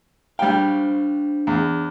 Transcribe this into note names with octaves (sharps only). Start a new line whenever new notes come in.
G3 D4 C5 F5 G5
E2